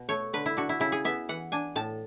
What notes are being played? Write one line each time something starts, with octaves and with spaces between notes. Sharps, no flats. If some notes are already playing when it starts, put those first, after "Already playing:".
Already playing: B2
A3 C#5
D3 B4
E4
D4 F#4
E4
C#3 E4
G#4
B3 E5
E3 F#5
D4 G#5
A2 A5